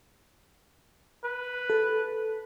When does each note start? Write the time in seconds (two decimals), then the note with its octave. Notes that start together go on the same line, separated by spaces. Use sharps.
1.24 B4
1.70 A4